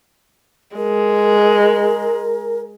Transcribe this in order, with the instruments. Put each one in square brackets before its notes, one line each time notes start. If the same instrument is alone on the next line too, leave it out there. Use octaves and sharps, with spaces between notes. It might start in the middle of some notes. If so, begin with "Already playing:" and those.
[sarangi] G#3 [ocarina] A#4